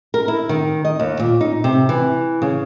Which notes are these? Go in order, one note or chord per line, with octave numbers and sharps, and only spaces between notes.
A#4
E4
D#3
D#5
D#2
A#2
D#4
C3
E3
C#3